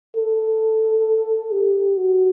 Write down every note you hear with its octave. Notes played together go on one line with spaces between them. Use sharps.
A4
G4
F#4